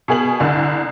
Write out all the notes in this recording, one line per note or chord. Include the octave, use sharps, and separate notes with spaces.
B2 G#4 F#7
C2 D3